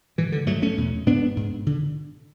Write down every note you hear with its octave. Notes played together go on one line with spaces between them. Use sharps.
G#2 E3
D3
G#2 F#3 A3
A3 C#4
E2 B2
G#2 B3 D4
G#2
D3